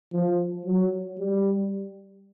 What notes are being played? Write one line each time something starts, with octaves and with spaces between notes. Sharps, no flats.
F3
F#3
G3